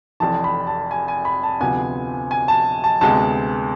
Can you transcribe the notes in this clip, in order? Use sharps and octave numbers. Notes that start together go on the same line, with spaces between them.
F1 F2 E3 A5
B5
A5
G#5
G#5
B5
A5
D2 C3 F3 B3 G#5
G#5
A5
A5
D2 C3 G#3 B3 A5